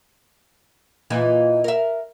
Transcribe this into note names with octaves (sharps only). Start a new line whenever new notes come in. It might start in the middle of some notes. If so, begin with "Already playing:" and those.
A#2 E3 D#4
A#4 E5